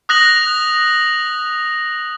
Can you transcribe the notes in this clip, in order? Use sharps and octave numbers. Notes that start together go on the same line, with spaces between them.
D#6 F#6 A#6 F7 F#7